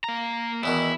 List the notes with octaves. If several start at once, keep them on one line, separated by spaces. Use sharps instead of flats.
A#3 A#5
E2 B2 D#3 E4